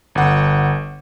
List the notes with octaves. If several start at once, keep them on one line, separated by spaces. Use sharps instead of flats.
G1 F#5